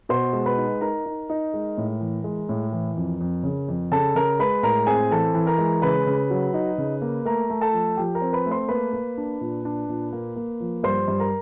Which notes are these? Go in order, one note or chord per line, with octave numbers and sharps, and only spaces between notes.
B2 C5 C6
G#3
B4 B5
D#4
D#4 A#4 A#5
D#4
D#4
G#3
A2
E3
G#3
A2
E3
F2
F2
C#3
F2
C#3 A4 A5
C#3 A#4 A#5
G#3 B4 B5
A2 A#4 A#5
C4 G#4 G#5
E3 A4 A5
E3
A#4 A#5
G#3
C#3 B4 B5
C#3
F#3
D#4
C#3
A#3
A3 A#4 A#5
A3
A4 A5
F3
F3 G4 G5
A#4 A#5
C4
B4 B5
A3
C5 C6
A#3 B4 B5
A#3
D4
A#2
D4
A#2
A#3
A#3
F3
G2 C5 C6
G2
A#4 A#5